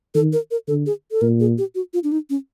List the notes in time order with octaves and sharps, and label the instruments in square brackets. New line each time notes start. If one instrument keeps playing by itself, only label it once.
[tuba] D#3 [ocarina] A4
[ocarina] A#4
A#4
[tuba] D3 [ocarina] A4
[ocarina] G#4
A4
[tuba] A#2 [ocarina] A#4
[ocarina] G#4
G4
F#4
F4
D4
D#4
C#4